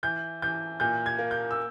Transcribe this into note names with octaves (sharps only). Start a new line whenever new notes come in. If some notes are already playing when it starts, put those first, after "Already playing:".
E3 G6
E3 G6
A#2 G6
G#6
A#3
G6
E6